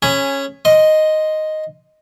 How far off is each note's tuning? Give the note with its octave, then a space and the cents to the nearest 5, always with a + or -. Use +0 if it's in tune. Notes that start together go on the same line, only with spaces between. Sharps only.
C#4 -10 G#4 +0 B5 +15
D#5 +0 C6 +0